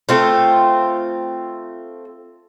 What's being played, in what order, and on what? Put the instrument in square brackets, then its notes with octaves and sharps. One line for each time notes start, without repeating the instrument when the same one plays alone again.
[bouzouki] A3 C4 F4